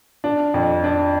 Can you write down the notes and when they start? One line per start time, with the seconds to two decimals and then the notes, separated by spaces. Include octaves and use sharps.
0.24 D4
0.54 F2
0.84 D4